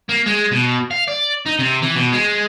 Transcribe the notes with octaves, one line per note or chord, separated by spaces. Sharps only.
A#3
G#3
B2
F5
D5
D#4
C3
E3
B2
G#3